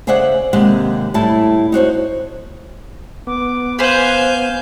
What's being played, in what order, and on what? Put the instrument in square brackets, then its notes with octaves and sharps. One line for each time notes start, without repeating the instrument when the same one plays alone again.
[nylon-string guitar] C#3 G#4 C5 D5 E5 F#5
D#2 C3 G#3 G4 F#5
A2 G3 E4 A5
D#4 F#4 C5 C#5
[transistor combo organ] B3 [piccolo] D6
[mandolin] B4 C5 [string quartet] F5 G6 [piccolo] G#5